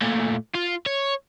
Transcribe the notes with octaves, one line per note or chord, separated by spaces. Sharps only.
A#2 A3
F4
C#5